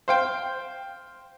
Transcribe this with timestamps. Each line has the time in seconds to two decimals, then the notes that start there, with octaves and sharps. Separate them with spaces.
0.08 C5 F5 G5